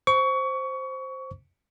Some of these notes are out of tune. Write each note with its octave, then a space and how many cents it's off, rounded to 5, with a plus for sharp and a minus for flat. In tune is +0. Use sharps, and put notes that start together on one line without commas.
C5 +0 C#6 +25